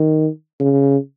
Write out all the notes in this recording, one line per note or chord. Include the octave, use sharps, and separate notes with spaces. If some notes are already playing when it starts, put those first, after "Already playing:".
Already playing: D#3
C#3